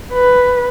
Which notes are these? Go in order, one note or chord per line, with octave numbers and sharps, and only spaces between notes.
B4